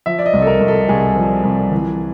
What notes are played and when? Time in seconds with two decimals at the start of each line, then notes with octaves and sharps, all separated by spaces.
0.06 F3 E5
0.19 D5
0.26 D#5
0.33 C2
0.42 A4
0.47 A#4
0.60 C2
0.68 A4
0.89 C2 G#4
1.16 F3
1.44 C2
1.72 E3